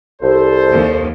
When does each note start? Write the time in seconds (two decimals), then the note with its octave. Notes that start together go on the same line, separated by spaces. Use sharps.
0.22 C2 A4 C5
0.71 D#2